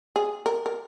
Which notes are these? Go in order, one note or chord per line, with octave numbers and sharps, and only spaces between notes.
G#4
A#4
A#4